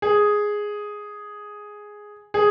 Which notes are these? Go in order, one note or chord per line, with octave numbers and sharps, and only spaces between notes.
G#4
G#4